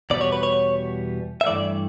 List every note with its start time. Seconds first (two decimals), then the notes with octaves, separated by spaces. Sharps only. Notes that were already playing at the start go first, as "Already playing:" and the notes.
0.10 E2 B2 G3 B3 D5
0.21 C#5
0.32 B4
0.43 C#5
1.41 E5
1.46 G2 E3 A3 D5